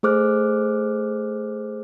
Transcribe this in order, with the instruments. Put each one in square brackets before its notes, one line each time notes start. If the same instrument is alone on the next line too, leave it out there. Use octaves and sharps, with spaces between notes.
[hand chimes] A3 G#4 C5 D6 F6 F#6